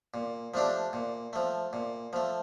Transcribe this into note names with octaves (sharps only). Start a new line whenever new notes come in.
A#2
F3 A3 D4 G4
A#2
F3 A3
A#2
F3 A3